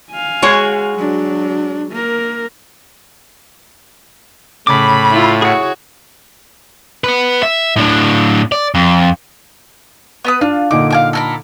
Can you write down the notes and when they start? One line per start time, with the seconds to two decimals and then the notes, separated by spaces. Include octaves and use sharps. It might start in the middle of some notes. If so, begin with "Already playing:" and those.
0.11 F5 G#5
0.42 G#3 F#4 C#5
0.95 F#3 D4
1.92 A#3 A#4
4.67 A2 C#3 B5 D6
5.11 E4 F4
5.42 F#4 G#4 C#5
7.04 B3 B4
7.43 E5
7.76 A2 D4
8.52 D5
8.75 F2
10.25 B3 B4 D#6
10.41 D4 F4
10.71 A#2 D3 D#4 D6
10.90 F5 G#5 D6
11.13 A4 A#4 B5